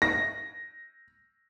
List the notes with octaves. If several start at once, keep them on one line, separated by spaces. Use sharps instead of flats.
A#6